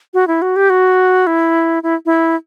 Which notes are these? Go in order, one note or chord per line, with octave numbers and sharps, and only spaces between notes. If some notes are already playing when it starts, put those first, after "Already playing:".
F#4
E4
F#4
G4
F#4
E4
E4
E4